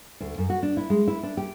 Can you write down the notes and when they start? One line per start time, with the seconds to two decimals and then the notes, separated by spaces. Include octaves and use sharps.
0.20 D2
0.38 F#2
0.50 F#4
0.63 D4
0.77 E4
0.90 G#3
1.08 E4
1.23 D4
1.37 G4